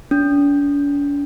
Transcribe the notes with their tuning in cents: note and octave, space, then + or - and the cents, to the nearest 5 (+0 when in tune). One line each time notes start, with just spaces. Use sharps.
D4 -45